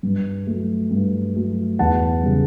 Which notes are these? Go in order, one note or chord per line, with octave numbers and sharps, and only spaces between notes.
G2
F#3 A3
G2
F#3 A3
E2 F#5 A5
C#3 G3